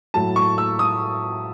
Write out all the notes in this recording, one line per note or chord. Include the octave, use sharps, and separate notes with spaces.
A2 F#3 A5
C#6
E6
D#6